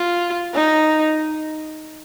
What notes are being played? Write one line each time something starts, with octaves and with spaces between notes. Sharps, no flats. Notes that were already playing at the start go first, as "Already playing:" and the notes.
Already playing: F4
D#4